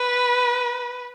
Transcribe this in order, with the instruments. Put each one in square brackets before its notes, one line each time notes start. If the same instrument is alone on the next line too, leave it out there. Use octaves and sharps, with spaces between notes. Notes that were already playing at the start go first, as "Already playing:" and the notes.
Already playing: [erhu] B4